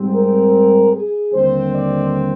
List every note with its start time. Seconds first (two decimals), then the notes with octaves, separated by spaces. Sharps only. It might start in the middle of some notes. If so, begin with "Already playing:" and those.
Already playing: G#2 G3 C4
0.10 A#4
0.92 G#4
1.33 D#2 D3 G3 C4 C5
1.74 D5